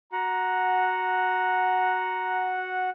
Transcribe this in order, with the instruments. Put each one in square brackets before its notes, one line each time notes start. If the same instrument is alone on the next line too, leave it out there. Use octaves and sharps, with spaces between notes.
[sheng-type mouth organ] F#4 F#5 [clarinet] A#5